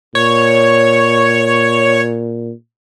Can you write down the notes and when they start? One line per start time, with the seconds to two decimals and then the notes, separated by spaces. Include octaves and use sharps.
0.15 A#2 C#5